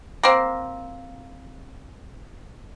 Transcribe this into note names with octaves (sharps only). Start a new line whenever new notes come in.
A#3 C4